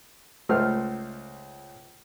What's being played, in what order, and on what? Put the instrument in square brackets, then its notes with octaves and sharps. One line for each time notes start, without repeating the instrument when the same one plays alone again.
[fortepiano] C#2 A3 C5 F6